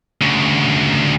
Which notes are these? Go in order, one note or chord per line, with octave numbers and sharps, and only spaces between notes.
D2 C#3